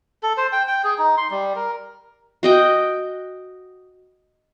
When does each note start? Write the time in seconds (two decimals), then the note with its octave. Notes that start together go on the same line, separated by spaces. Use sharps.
0.23 A4
0.37 C5
0.52 G5
0.68 G5
0.84 G#4
0.98 D#4
1.17 C6
1.30 G3
1.56 A#4
2.43 F#4 D#5 G5